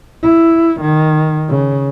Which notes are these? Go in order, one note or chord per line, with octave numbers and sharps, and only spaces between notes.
E4
D#3
C#3